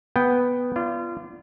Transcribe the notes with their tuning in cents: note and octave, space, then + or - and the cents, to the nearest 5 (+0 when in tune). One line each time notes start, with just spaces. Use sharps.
B3 +0 G5 +0
F4 -30 D5 +0